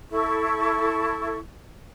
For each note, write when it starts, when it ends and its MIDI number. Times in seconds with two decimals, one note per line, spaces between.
0.10 1.38 64
0.10 1.38 69
0.10 1.38 85